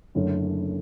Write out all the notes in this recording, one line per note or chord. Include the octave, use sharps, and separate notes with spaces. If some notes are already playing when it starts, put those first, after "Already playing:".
F#1 F#2 D3 A3 C#4